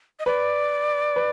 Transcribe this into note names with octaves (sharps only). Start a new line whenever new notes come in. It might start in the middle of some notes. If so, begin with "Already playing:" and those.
D#5
B4 D5
B4